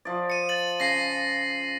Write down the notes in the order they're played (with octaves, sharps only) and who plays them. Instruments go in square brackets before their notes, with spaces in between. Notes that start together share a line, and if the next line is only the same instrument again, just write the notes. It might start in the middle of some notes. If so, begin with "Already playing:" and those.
[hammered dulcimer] F3 D5
[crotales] C#7 D#7
A6 F#7
[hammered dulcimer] C#3 [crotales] A#6 C7